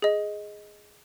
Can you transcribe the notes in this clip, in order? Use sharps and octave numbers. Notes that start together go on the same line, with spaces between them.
G#4 D#5